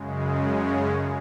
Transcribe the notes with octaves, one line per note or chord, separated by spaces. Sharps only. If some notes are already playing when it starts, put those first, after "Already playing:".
Already playing: F#2 C#3 G#3
C#4 C#5